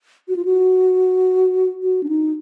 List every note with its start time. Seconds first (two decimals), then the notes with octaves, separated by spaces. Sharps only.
0.28 F#4
0.36 F4
0.45 F#4
1.83 F#4
2.03 D4
2.09 D#4